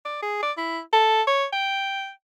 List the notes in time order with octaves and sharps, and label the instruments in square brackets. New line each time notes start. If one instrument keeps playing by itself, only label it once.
[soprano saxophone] D5
G#4
D5
E4
A4
C#5
G5